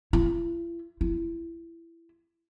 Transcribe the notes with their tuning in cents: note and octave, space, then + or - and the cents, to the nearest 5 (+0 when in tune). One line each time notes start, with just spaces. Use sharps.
E4 +45
E4 +20